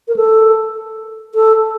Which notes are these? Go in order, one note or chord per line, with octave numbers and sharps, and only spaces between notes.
A#4
A4
A4